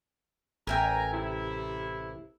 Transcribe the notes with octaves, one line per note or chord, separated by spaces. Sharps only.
A1 A#4 E5 G5 G#5 A#5
C3 E4